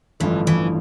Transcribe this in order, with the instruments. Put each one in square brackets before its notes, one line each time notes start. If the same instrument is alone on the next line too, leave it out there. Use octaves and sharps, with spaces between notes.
[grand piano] A1 G2 D3 F3 A3 [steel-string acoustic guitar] E3
[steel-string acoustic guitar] E3